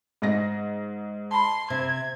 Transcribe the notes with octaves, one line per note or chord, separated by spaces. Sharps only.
G#2 D#5 A#6
A5 B5 C6
C3 G#6